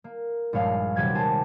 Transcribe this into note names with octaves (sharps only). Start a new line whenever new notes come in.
A#3
A#1 G2 G#3 C#5 F5
D#1 C3 F#3 G4 B4 G#6
G4 C5 G#5 A5